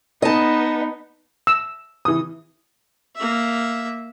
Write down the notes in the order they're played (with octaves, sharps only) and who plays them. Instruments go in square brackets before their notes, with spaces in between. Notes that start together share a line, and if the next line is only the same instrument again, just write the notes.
[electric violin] B3 D#4 [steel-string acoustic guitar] D#5 A5
[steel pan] E6
[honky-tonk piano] E3 D#6
[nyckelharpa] A#3 E5